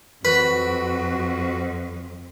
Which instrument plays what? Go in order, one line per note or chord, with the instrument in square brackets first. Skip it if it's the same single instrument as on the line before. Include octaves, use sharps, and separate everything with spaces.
[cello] F2 [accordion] F#4 [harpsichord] B4